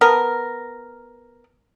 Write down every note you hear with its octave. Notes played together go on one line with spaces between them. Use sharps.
B3 A#4